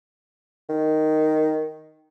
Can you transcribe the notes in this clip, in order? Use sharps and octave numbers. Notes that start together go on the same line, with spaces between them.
D#3